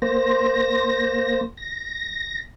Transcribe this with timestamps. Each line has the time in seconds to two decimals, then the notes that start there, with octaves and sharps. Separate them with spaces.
0.02 A#3 C5 A#6
1.57 A#6